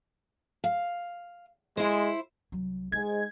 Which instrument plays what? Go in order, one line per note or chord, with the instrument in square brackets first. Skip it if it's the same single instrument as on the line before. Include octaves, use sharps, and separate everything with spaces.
[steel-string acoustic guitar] F5
[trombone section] G#3 [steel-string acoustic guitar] E4 C5
[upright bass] C2 F#3
[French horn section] G#2 G#3 [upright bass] D#4 [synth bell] G#6